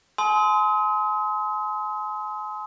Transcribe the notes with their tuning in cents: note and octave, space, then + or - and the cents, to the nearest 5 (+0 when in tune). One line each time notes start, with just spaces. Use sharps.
G#5 +40 C6 -20 D#6 +40